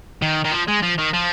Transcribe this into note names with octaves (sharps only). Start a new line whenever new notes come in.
D#3
D#3
F3
G#3
F3
D#3
F3